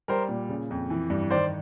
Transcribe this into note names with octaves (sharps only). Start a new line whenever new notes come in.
G3 A#4 C5
A#2
C#3
F2
E3
G2
D#3 C5 D5